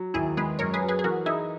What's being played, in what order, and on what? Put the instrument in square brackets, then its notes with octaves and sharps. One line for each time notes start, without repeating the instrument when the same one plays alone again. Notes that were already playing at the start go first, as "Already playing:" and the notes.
Already playing: [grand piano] F#3
[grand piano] D#2 [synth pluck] E4 G#4
[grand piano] G#3 [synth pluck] G#4 B4
[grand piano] F#2 [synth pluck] A#4 C#5
[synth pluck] G#4 B4
[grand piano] F#3
[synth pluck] G#4 B4
G#4
[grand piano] E3 [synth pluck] F#4 A#4
[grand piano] D#4 [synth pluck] E4 G#4